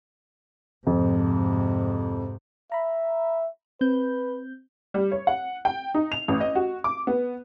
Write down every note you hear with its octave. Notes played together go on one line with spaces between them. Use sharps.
F2 G#2 C3
E5 A#5 B5
C4 B4 G6
G3
C#5
F#5
G5
D#4
F7
A1
D#5
F#4
D6
B3